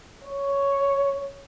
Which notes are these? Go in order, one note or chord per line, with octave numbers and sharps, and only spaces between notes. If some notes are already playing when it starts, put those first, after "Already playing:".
C#5